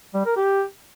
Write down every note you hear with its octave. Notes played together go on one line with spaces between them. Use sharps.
G3
A#4
G4